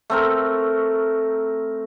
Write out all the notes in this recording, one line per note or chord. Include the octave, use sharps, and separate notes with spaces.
A3 C4 A#4